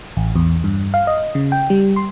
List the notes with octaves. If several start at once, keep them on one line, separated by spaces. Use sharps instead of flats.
A1
E2
G2
F5
D#5
C#3
G5
G3
C6